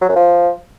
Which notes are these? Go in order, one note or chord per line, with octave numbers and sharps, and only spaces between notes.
F#3
F#2
F3